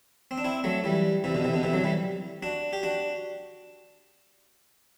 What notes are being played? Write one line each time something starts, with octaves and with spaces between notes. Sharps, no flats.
C4
D4
C4 E4
F#3 A3
E3 G3
C3 E3
B2 D3
C3 E3
B2 D3
C3 E3
D3 F#3
E3 G3
D4 F#4
G4
D4 F#4